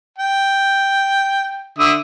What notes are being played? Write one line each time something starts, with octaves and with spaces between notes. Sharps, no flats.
G5
D3 E5 D#6